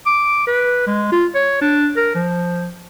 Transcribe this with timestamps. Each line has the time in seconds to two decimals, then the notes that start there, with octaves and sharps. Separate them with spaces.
0.06 D6
0.47 B4
0.87 G#3
1.12 F4
1.35 C#5
1.62 D4
1.96 A#4
2.15 F3